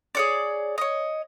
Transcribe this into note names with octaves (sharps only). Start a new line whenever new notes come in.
G#4 C#5 D5
C#5 D#5